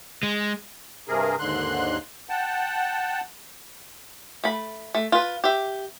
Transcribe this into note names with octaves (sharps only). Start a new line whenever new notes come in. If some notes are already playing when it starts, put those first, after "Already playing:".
G#3
G2 C3 G#4 A#4
D#2 G#2 D3 C6 F#6
F#5 G5 A5
A3 B5
A3
F4 B4
G4 E5